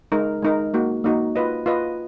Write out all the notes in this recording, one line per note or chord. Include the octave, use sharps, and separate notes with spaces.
G#3 D#4 A#4
G#3 D#4 A#4
A#3 D#4 F#4
A#3 D#4 F#4
F4 B4 D#5
F4 B4 D#5